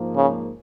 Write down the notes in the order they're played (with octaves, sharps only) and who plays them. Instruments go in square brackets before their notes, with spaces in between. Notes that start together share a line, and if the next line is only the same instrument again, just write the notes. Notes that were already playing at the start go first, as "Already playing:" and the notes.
Already playing: [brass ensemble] G#2 F3 A#3
[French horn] C#3